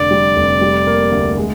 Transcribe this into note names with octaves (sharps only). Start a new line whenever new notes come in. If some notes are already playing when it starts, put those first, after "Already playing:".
Already playing: F1 D3 D5
G3
F1
G3
A#3
D2
G#3